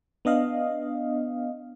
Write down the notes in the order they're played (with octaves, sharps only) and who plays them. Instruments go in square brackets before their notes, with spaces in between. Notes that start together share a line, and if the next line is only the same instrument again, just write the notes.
[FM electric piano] B3 D4 D#5 F5